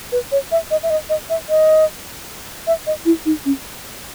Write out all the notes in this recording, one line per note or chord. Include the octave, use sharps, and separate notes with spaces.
B4
C#5
E5
D#5
E5
D#5
D#5
E5
D#5
E5
D#5
E4
D#4
C#4